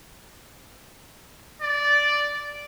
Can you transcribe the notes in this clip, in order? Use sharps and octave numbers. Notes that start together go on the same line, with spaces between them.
D5